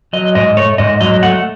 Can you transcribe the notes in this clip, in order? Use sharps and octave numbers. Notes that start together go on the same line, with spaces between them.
F#3 D#5
G#2 D#5
A3 C#5
G#2 D#5
F#3 D#5
A3 F#5